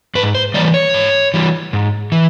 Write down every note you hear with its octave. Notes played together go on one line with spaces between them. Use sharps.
G#2 B4
C5
E3 G3 D5
C#5
G#2
E3 G3
G#2
E3